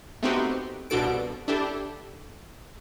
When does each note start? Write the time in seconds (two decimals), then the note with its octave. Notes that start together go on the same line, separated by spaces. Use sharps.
0.23 A3 B3 C4 D#4 F#4 G4
0.90 C2 B2 D4 F#4 A4 D7
1.48 D4 E4 G4 A4